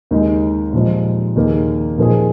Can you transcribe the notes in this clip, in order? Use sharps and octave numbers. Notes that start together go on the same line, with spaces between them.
D#2 D#3 G#3
A#2 F3 G#3
D#2 D#3 A#3 G#4
A#2 F3 A#3 D#4 G#4